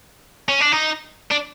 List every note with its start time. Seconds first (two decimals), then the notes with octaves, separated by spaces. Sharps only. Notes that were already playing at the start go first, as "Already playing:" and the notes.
0.49 C#4
0.60 D4
0.72 D#4
1.31 D4